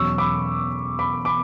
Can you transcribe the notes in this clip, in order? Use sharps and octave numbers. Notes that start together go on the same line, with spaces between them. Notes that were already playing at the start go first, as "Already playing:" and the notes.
Already playing: E2 B2 F#3 C#4 C#6 E6
B5 D6
B5 D6
B5 D6